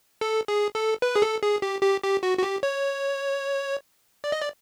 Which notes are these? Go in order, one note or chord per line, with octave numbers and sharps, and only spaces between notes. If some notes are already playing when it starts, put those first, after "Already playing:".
A4
G#4
A4
B4
G#4
A4
G#4
G4
G4
G4
F#4
F#4
G4
C#5
D5
D#5
D5